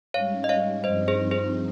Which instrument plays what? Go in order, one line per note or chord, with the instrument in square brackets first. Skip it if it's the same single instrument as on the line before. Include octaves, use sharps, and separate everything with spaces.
[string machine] G#2 G3 C#4 [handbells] C#5 F5
[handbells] D#5
C#5 F5
[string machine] G2 F3 C4 D#4 [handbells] C5 D#5
[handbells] G#4 C5
G#4 C5